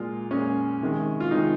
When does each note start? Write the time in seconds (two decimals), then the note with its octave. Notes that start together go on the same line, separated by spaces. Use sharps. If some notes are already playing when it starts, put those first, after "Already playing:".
Already playing: A#2 G#3 F4
0.31 A#2 G#3 C#4
0.81 C3 D#3 G#3
1.20 F4
1.31 C3 D#3 G#3 D#4